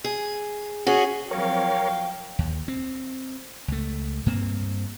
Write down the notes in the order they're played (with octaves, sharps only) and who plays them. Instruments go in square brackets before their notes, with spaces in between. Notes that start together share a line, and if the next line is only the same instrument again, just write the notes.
[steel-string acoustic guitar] G#4
[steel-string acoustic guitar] C#4 [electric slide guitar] F#4 [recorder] G#4
[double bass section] F3 F#3 C4 [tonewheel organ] A#4 C#5 [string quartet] F5 [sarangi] G5
[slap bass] D#2
C4
C#2 A3
G2 A#3 C4